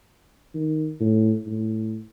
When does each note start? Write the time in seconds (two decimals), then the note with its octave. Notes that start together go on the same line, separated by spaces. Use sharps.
0.54 D#3
1.00 A2
1.46 A2